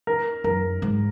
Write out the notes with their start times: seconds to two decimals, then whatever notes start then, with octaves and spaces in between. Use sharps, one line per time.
0.07 A#4
0.44 F#2 A#4
0.82 G#2